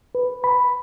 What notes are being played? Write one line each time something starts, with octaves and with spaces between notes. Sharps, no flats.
B4
B5